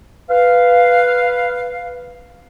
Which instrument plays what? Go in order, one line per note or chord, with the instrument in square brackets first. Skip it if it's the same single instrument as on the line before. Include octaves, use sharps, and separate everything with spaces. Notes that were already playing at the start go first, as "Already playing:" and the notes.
[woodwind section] B4 F5